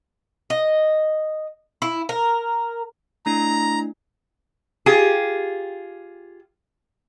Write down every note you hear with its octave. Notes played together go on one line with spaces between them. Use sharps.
D#5
E4
A#4
A3 D4 E4 A#5
F4 G4 G#4